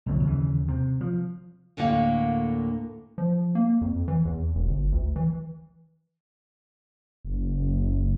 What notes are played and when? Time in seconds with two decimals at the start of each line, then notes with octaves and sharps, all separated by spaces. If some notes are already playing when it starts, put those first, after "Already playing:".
0.06 B1 F2 D3 F#3
0.23 D#2 C#3 E3
0.68 C3
1.01 F3
1.77 D2 A2 D3 A#3 F5
3.18 F3
3.55 A#3
3.81 F2
4.08 E3
4.25 E2
4.55 E1
4.67 G1
4.92 D2
5.16 E3
7.25 F#1